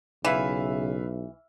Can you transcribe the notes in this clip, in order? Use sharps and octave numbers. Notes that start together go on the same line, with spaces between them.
B1 C#3 E3 B4 E5 F5